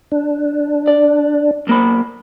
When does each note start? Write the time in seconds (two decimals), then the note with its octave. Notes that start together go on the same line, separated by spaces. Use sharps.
0.12 D4
0.88 D5
1.67 B1 A#3 B5